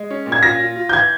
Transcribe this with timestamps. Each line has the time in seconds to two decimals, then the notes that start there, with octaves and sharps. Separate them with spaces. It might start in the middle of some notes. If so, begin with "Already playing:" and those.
Already playing: G#3
0.10 C#4
0.26 A#2
0.32 G#6
0.43 F4 A#6
0.60 F4
0.76 F4
0.89 G6
0.93 E3 G#6